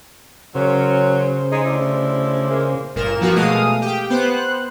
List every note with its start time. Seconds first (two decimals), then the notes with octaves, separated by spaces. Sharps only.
0.55 C#3 F#3 A#3 C#4 C5
1.53 G#3 D#4 G#4
1.66 D2 E4 D5
2.51 G#3 A#3
2.96 G1 A#2 A#4 E7
3.21 F3 A#3 B3 F#4 A#4
3.36 B2 G#3 A3 F5 D#6
3.82 G4 G5
4.10 B3 C5 F#6